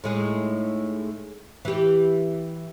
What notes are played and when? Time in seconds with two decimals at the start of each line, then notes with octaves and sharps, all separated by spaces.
0.04 A2 G#3 D#4
1.65 E3 G4